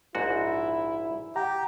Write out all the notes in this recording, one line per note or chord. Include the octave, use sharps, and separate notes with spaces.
A#1 G#2 E4 F#4
G4 F#5 A#5